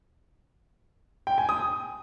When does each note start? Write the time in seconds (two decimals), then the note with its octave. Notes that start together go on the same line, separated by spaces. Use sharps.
1.27 G5
1.38 G#5
1.49 D#6